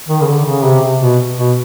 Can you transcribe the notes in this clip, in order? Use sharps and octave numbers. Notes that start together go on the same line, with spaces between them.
D#3
C#3
D3
C#3
C3
B2
B2